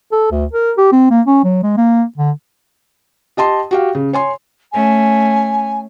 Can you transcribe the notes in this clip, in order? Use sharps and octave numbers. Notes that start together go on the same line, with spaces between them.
A4
D2
A#4
G4
C4
A#3
C#4
F#3
G#3
A#3
D3
G4 D#5 A5 C6
F#4 G4 F5
C#3
C#5 G#5 C6
A3 C#4 G#5